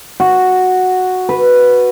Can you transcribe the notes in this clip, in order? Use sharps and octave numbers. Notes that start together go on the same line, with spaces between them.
F#4
B4